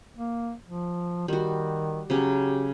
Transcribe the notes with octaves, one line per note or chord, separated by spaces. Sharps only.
A#3
F3
D#3 G3 F#4
C#3 F#3 C#4 G4